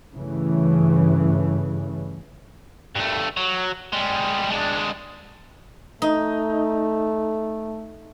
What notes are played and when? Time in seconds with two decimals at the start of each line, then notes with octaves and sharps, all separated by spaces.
0.14 G2 C#3 E3 A3
2.96 G2 A3
3.37 F#3
3.93 G3 G#3
4.50 G#3 D4
6.02 A3 D#4